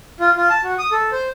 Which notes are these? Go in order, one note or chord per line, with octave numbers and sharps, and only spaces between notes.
F4
F4
A5
F#4
D#6
A4
C5